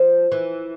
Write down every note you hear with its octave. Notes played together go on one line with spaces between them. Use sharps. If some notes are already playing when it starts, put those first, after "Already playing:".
Already playing: F3
E3